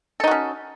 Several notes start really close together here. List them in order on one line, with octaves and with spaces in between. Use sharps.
A4 D#4 F#4 C#4